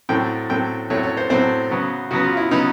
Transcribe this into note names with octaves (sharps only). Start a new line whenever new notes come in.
A2 F#3 A3 C4 G5
A2 F#3 A3 C4 G5
A2 F#3 A3 C4 C#5
C#5
C5
A2 F#3 A3 C4 C5
C#3 F#3 B3
C#3 F#3 B3 F#4
F4
E4
C#3 F#3 B3 D#4